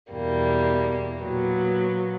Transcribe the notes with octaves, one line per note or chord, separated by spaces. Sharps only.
E2 B2 G3 A#3
A#2 F#3 B3